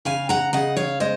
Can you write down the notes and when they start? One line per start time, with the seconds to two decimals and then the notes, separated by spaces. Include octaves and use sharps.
0.05 C#3 F5 G#5
0.29 F#5 A#5
0.53 C#3 D#5 F#5
0.76 C#5 F5
1.00 G#3 C5 D#5